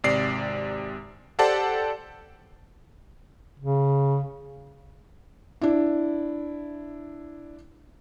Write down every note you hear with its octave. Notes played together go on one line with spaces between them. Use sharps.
G#1 C3 D5 C7
G4 A4 C5 D5 F#5 A5
C#3
D4 E4